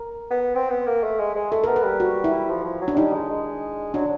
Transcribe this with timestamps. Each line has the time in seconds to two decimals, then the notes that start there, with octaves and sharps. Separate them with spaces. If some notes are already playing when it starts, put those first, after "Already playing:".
Already playing: A#4
0.31 B3
0.55 C4
0.70 B3
0.87 A#3
1.04 A3
1.19 G#3
1.35 G#3
1.51 A3 A4
1.64 B3 A#4
1.76 B4
1.84 G3
2.00 F#4
2.24 E4
2.49 F3
2.65 F3
2.82 F#3
2.88 D4
2.97 G3 D#4
3.13 G#3
3.30 G#3
3.94 F#3 D4